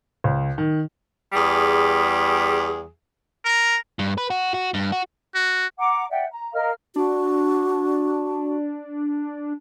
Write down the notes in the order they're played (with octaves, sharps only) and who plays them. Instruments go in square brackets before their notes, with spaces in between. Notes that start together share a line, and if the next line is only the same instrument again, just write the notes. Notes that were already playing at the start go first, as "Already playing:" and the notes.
[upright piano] C#2
D#3
[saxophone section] E2 G3 G#4
[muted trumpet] A#4
[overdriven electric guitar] G2
B4
F#4
F#4
G2
F#4
[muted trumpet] F#4
[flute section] F#5 A#5 D6
D5 E5 F#5 G5
A#5
A#4 D#5 F5 F6
[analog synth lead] D4 [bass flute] F#4